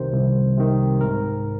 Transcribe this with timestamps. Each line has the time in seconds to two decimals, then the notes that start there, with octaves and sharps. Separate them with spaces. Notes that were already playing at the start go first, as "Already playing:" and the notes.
Already playing: C2 C3 D#3 C5
0.12 C2
0.57 C3 D#3
1.01 G#2 A#4